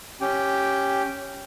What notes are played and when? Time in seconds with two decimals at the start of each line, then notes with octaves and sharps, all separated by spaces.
0.21 C#4 G4 G5